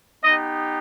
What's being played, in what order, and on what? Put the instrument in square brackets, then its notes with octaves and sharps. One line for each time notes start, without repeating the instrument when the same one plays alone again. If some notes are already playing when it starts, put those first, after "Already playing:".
[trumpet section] B3 D#4 G4 D#5